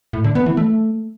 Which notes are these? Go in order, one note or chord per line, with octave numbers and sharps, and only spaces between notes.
A2
D3
B3
E3
A3